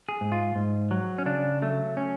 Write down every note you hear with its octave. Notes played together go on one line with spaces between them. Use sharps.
G#4
G#2
F4
G#2
F#3
C#4
C#3 D4
F#3 A3
C#4